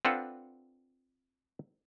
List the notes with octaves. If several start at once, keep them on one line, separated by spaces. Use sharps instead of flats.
C4 D4 F4 A4 B4 F#5